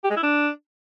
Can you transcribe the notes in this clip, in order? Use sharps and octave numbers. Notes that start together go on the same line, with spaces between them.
G4
G#3
E4
D4